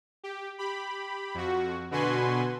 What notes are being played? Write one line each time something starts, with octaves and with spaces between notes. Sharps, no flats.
G4
G4 B5
F2 F#4
B2 D3 F#4 B4 G#5 C6